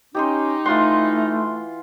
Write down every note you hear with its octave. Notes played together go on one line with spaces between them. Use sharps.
C#4 D#4 G4 D#5 C6
E3 A3 F4 F#5 C6